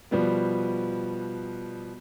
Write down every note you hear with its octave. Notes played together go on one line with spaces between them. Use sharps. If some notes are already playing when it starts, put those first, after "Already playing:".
B2 F3 G3 B3